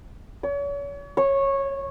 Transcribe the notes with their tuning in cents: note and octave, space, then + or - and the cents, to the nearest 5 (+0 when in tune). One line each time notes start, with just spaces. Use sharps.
C#5 +40
C#5 -15